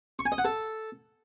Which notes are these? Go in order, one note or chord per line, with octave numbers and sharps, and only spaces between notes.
C#6
G#5
D#5
F#5
A4